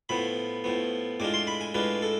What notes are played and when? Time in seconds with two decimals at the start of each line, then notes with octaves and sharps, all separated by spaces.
0.09 A2 F3 B3 B5
0.64 A2 F3 B3
1.20 A2 G#3 D4 F4 D6
1.34 C6
1.47 B5
1.61 G#5
1.74 A2 G#3 D4 F4 B4
2.02 A4